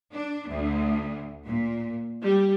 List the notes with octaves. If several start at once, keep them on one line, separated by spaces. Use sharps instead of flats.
D4
D2
A#2
G3